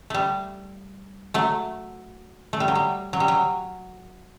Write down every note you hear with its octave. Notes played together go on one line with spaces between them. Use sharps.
G3 A3
F#3 A3
A3
G3
F#3
G3
F#3
G3
F#3